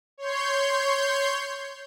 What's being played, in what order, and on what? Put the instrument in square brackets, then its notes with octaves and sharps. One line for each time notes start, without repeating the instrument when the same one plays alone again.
[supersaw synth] C#5 C6 G6